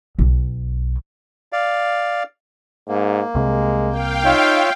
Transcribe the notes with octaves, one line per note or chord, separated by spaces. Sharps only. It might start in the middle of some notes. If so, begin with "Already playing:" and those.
B1
D5 F5
G#2 A#3
C2 C3 G#3
F5 G5
D#4 F4 C#5 E5